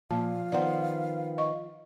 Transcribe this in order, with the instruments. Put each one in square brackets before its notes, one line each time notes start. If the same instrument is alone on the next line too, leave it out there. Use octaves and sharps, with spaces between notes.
[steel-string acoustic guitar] A#2 [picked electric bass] F3 [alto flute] F5 [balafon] A5
[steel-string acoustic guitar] D#3 B3 C5 [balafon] D5 F#5
[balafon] D#5 C#6